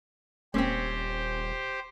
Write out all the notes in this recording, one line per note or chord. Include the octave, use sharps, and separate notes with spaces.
D#1 G#3 A#3 C4 C#4 G4 C5